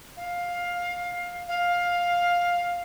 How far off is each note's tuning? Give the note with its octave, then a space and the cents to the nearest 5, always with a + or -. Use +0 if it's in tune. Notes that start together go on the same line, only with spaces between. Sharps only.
F5 +15
F5 +10